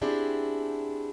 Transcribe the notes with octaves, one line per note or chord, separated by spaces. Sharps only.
B3 C4 D4 E4 G4 G#4